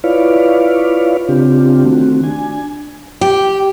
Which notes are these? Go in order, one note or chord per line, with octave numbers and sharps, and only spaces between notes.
E4 F4 B4 C#5 D5 F5
C#3 C4 D4 F4 G4
D#3 A3 C4 F#4
D4 G#5
G4